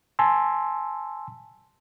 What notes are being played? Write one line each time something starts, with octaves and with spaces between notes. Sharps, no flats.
G#5 A5 C6 E6